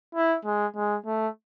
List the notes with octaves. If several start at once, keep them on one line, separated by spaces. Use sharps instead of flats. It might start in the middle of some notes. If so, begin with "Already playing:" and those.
E4
G#3
G#3
A3